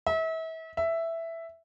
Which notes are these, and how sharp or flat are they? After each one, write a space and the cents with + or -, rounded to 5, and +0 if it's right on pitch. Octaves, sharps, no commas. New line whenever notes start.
E5 -35
E5 +5